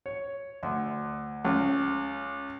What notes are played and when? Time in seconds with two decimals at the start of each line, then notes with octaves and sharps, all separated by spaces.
0.06 C#5
0.63 D2
1.44 C#2